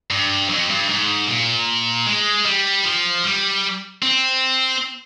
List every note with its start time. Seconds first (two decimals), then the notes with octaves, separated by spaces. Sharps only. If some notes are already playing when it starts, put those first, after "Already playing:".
0.10 G2
0.49 F2
0.69 G2
0.89 G#2
1.27 A#2
2.06 G#3
2.46 G3
2.85 F3
3.24 G3
4.03 C4